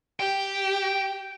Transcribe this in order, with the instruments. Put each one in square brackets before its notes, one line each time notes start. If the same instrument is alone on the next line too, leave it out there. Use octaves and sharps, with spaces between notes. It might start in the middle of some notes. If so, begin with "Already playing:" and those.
[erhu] G4 [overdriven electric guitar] G5